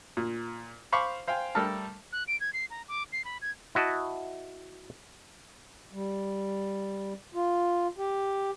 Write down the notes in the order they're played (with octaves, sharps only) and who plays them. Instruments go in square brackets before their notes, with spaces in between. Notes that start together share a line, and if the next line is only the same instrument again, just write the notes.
[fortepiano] A#2
C5 F5 B5 C#6 D6
C5 F5 G5 G#5
G3 A3 A4 A#4 A5 F6
[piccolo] F#6
D7
G#6
C7
A#5
D6
C7
B5
G#6
[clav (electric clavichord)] E4 F#4 D#5 A5
[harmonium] G3
F4
G4